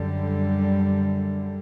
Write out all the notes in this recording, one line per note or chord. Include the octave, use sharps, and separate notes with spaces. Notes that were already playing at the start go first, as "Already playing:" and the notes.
Already playing: F#2 D3 G3